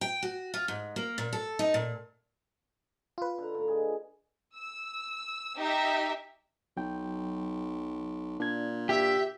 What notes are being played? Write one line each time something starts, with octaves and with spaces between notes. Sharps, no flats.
G5
F#4
F4
G#2
A#3
A#2
A4
D#4
A#2
F4 B4
D3 A#5
A2 D3
G#4 D#5
E6
D#4 G4 E5
B1 F#3 G5
A#2 D4 G#6
G4 E5